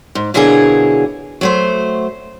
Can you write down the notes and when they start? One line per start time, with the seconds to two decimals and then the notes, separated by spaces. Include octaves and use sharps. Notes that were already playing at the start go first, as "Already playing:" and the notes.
0.15 G#2
0.34 B2 D3 F#3 A#3 E4 G#4
1.41 F#3 A3 C5